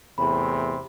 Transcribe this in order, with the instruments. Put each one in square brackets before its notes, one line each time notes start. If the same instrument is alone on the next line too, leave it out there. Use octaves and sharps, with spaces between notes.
[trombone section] E2 A2 C3 [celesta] B5